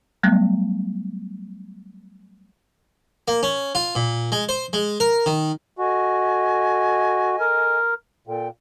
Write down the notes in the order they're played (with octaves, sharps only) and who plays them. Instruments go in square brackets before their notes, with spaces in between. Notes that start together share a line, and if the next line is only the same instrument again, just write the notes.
[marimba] F#3 G3 A3 B3
[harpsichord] A#3
C#4
F4
A#2
G#3
C5
G#3
A#4
D#3
[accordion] F#4 [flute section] A4 D#5 G#5
[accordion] A#4
[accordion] A#2 [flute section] A4 G5